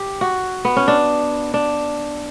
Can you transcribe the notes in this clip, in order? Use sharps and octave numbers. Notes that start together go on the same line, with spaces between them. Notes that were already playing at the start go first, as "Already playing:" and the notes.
Already playing: G4
F#4
B3
C#4
D4
D4